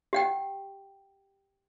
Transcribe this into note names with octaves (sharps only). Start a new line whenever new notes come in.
G4 F#5 G5